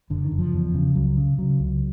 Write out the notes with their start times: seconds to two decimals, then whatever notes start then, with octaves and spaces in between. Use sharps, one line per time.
0.10 F#1 D3
0.25 D#3
0.31 F#1
0.38 F3
0.53 E2
0.74 C#3
0.95 C#2 F#3
1.17 C#3
1.38 C#3 F#3
1.59 C#2